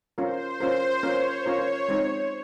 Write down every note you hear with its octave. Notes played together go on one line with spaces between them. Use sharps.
C#4 F4 A#4 C5
C#4 F4 A#4
C#4 F4 A#4 C#5
C#4 F4 A#4 C#5
G#3 C4 D#4